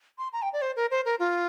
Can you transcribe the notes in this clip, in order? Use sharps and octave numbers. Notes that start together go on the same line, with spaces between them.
C6
A#5
G5
D5
C5
A#4
C5
A#4
F4